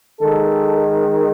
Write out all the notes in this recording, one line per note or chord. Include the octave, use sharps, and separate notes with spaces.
D#3 G#3 A4